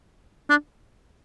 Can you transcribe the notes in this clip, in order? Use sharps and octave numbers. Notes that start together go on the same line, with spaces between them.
D4